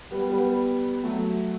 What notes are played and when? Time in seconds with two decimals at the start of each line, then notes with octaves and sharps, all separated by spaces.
0.11 G3 B3
0.29 G3 B3
1.03 F#3 A3